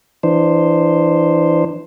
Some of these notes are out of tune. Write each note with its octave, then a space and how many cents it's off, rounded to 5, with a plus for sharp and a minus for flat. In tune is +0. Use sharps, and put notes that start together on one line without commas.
E3 +10 D4 +25 C5 +0